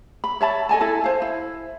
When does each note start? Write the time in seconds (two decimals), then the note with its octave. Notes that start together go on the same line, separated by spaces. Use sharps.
0.24 B5
0.41 C#5 E5 A5 B5
0.69 A4 D#5 G#5 A5
0.81 E4 A4 A5
1.04 C5 F5
1.22 E4